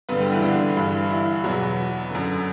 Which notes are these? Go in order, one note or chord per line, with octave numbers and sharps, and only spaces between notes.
G2 D3 B3 B4
G3 G4
E3 E4
D3 D4
G2 E3
E3 E4
E2 B2 F#3 F#4
F#2 D3